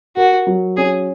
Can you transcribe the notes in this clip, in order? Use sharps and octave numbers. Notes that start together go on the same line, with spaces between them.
F#4 A#4
F#3
C#4 G#4